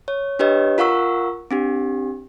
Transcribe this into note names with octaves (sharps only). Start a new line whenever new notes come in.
C#5
D4 G4 B4 C#5 D#5
F4 A#4 F5 F#5 C#6 E6
C4 D4 G4